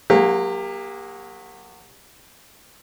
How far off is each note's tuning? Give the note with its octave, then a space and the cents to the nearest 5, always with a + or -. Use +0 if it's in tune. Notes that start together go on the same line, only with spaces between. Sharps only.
F#3 -25 A#3 +0 G4 +25